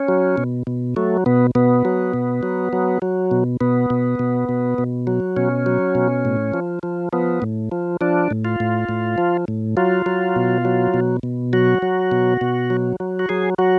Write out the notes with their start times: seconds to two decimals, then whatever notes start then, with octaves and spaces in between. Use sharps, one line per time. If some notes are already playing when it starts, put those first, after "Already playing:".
Already playing: C#4
0.08 F#3
0.38 B2
0.67 B2
0.96 F#3 A3
1.26 B2 B3
1.55 B2 B3
1.85 F#3
2.14 B2
2.43 F#3
2.73 F#3
3.02 F#3
3.31 B2
3.61 B2 B3
3.90 B2
4.19 B2
4.49 B2
4.78 B2
5.07 F#3
5.37 B2 C#4
5.66 F#3
5.95 B2
6.25 A2
6.54 F3
6.83 F3
7.13 F3 B3
7.42 A2
7.72 F3
8.01 F3 D4
8.31 A2
8.45 F4
8.60 A2
8.89 A2
9.18 F3
9.48 A2
9.77 F#3 F4
10.06 F#3
10.36 B2
10.65 F#3
10.94 B2
11.23 B2
11.53 F#3 F#4
11.82 F#3
12.11 B2
12.41 B2
12.70 F#3
13.00 F#3
13.19 F#4
13.29 F#3 G#4
13.58 F#3 F#4